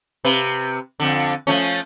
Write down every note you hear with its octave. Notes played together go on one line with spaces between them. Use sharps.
C3 B4
F2 D3
F3 A3 C#4